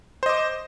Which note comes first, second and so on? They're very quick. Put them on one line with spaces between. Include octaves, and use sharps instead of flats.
C5 D#5 D6